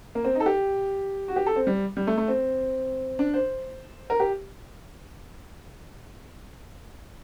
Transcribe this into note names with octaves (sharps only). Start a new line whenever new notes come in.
A#3
C4
D#4
A4
G4
F#4
G4
A4
C4
G3
G3
A3
A3
C4
D4
C5
A#4
G4